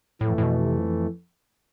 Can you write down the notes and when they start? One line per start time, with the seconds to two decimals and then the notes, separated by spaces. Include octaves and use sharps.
0.21 F2 A2 E3 A3
0.38 A2
0.43 B2
0.63 C3
0.78 F3